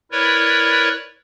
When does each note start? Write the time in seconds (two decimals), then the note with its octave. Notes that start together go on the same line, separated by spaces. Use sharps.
0.11 E4 A#4 B4 C#5 D5